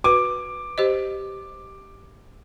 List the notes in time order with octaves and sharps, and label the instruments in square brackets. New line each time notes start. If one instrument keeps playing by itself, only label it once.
[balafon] F#4 B4 [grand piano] D6
[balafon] G4 C5 D#5